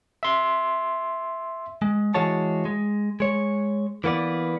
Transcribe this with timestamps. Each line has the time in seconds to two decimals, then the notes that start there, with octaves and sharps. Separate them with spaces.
0.23 E5 C6
1.82 G#3
2.14 E3 G#3 F#4 C#5 A5
2.65 G#3
3.20 G#3 C#5
4.04 E3 A#3 B3 D5